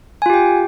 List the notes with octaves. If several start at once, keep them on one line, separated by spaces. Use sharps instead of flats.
F4 G4 G5 G#5